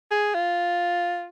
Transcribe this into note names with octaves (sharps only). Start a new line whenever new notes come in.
G#4
F4